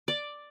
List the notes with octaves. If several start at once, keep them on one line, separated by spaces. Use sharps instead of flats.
D5